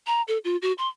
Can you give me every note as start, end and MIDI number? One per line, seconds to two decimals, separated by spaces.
0.07 0.22 82
0.28 0.38 69
0.44 0.57 65
0.62 0.72 66
0.78 0.88 84